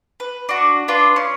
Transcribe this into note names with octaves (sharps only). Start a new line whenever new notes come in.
B4
D4 F#4
D4 F4 B4
C#4